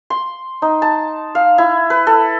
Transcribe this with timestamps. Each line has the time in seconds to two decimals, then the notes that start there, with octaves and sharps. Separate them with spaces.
0.10 C6
0.62 D#4
0.82 A5
1.35 F5
1.58 E4
1.90 B4
2.07 A4